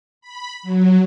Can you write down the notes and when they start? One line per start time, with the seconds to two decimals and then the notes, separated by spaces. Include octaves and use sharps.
0.21 B5
0.63 F#3